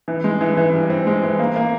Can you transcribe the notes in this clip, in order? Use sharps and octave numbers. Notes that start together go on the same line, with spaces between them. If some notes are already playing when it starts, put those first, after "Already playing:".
E3
G#3
E3
E3
G2
C4
G#3
E3
A#3
A#3